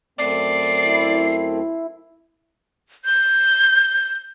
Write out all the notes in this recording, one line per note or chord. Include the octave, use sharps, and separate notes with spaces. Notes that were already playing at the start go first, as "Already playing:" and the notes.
F#2 A3 C4 D5 C7
E4
G6